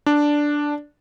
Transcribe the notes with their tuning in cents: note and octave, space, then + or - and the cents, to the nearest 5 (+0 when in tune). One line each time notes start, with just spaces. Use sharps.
D4 +0 D5 +0